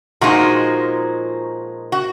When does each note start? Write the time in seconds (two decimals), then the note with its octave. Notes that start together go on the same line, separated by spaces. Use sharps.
0.21 A#2 F3 G#3 D#4 F#4
1.92 F#4